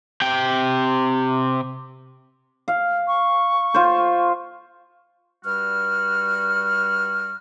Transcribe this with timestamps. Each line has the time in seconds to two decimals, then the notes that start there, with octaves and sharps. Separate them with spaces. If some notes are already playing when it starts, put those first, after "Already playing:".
0.22 C3 G5
2.68 F5
3.08 C#6
3.74 F4 C5
5.44 G2 G3 F#4 F6